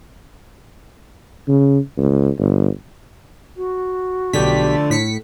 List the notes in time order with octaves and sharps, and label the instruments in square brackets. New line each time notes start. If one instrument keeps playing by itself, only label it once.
[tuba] C#3
C#2
G1
[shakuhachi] F#4
[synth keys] B1 G4 B6 [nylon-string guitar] D3 [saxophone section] F3 A3 D5
[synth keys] A2 B6 C#7